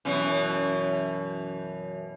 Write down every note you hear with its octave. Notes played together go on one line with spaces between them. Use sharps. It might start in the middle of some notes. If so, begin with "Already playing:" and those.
F#2 B2 E3